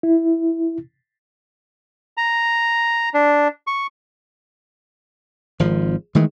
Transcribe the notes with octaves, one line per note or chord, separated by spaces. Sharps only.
E4
A#5
D4
C#6
G#1 F3
D#3 E3 G#3 A3